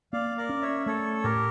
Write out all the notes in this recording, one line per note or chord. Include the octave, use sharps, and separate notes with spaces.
A#3 D5 F5
A#4 D5
C#4
C#5 E5
A3 A4 C#5
A2 G4 A#4